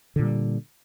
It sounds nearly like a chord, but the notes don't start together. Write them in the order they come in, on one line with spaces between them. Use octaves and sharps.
D3 A#2 G3